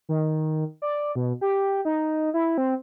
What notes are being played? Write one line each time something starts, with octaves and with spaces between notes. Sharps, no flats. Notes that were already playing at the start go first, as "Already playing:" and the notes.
D#3
D5
B2
G4
D#4
E4
C4